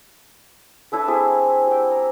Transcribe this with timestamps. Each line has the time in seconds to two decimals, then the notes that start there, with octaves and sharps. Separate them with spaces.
0.92 D4 E4 A4 B4
1.07 C4 E4 G#4 C5
1.67 G4 G5
1.91 A#5